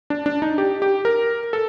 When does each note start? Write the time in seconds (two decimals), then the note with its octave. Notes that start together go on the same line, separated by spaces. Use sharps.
0.10 D4
0.26 D4
0.42 D#4
0.58 G4
0.82 G4
1.05 A#4
1.53 A4